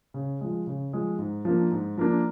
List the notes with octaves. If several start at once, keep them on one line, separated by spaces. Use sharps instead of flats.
C#3
F3 G#3
C#3
F3 G#3
G#2
F3 A#3 D4
G#2
F3 A#3 D4